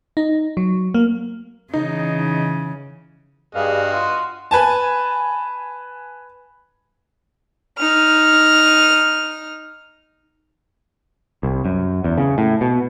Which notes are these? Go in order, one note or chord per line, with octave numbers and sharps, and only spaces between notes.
D#4
F#3
A#3
C#3 E3 D#4
G2 F#4 G#4 D#5 F5
F4 F5
B4 G#5 A5
D#4 F6
C2
F#2
E2
C#3
A2
B2